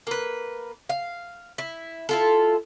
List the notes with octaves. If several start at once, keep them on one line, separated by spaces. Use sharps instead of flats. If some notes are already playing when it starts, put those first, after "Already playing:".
A#3 B4
F5
E4
E4 F4 A4